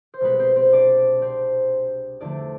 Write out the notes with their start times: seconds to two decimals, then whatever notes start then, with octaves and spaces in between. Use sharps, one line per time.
0.14 C5
0.21 C2 B2 G#3 B3 B4
0.39 C4 C5
0.55 C4 C5
0.73 D4 D5
1.22 C4 C5
2.21 E2 D3 F3 A3 D4 D5